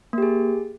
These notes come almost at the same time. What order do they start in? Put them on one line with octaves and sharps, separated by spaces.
A#3 G4 G#4